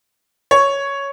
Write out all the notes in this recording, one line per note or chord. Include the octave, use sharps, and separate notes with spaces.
C#5